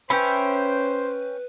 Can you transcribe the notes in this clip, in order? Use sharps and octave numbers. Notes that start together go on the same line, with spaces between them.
C#4 B4 C5 E5 G5 B5